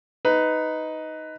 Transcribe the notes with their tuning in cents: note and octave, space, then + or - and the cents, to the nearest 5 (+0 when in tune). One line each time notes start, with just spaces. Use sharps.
D#4 +10 B4 +15